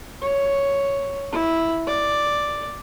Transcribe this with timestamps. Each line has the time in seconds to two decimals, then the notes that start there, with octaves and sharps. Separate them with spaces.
0.22 C#5
1.32 E4
1.87 D5